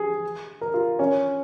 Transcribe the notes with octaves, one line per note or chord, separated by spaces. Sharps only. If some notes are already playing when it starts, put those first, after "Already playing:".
Already playing: G#4
A#4
F4
C#4